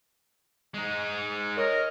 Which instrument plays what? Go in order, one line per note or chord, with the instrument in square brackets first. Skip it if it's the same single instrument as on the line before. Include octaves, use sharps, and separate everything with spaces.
[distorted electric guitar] G#3 D#4
[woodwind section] A#4 C#5 D#5